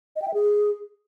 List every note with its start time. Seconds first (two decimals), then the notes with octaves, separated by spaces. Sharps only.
0.16 D#5
0.22 G5
0.28 E5
0.34 G#4